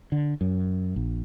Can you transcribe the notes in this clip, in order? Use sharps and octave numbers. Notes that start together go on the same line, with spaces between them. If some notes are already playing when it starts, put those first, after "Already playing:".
D3
F#2
A#1